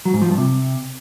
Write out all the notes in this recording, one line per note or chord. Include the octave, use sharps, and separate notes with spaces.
F#3
G#2
F3
G2
C3